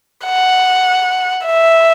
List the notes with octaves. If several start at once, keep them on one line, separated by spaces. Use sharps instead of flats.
F#5
E5